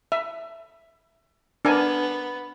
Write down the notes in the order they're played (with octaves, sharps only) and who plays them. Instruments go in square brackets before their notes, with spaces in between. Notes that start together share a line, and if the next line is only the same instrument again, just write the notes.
[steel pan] E5
[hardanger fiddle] B3 [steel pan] D4 A#4 G#5